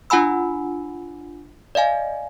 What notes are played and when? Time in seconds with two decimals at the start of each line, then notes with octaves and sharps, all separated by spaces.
0.10 D4 F4 F#5 G#5 B5 E6
1.75 D5 D#5 F5 G#5